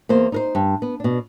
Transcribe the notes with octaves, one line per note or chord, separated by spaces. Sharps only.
E2 A#3 C5
D#4 A#4 C5
G2
B3
B2 D4